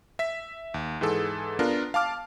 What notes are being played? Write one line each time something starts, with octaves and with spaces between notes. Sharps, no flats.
E5 B6
D#2
G#2 E3 G#4 A4
B3 D4 F4 A#4
F5 A5 D6 F6